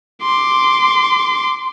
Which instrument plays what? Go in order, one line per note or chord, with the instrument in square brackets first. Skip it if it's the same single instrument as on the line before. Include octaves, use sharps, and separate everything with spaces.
[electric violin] C6 D6